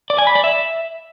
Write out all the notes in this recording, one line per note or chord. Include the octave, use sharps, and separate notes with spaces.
D5
G#5
B5
D5
E5